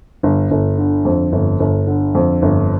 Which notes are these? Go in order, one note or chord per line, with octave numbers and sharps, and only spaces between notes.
G1
G1
D3
F2
G1
G1
D3
F2
G1